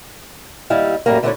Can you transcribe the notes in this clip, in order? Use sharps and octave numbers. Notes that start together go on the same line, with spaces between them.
D#2 G3 E4 F5
F#2 A2 G3 A#3
D3 A3 A#3 D4 E4 C#5